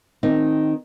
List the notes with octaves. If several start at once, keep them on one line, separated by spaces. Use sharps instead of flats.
D#3 C4 D#4